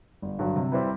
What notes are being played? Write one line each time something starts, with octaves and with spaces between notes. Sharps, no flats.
G1
G2 D3 F#3
C3
G3 C4 E4 B4